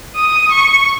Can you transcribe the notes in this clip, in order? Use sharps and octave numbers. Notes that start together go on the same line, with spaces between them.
D#6
C#6